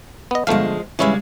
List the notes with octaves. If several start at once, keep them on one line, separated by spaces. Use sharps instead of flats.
B3 D#5
G1 F3 G#3 A3 F5
C#3 E3 G3 G#3 C#4 E4